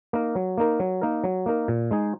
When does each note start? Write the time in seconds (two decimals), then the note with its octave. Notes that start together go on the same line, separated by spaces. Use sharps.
0.13 A#3 D#4 A#4
0.35 F#3
0.58 A#3 D#4 A#4
0.80 F#3
1.02 A#3 D#4 A#4
1.24 F#3
1.46 A#3 D#4 A#4
1.68 A#2
1.91 G#3 D#4 G#4